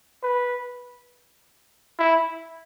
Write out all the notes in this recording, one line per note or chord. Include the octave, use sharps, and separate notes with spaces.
B4
E4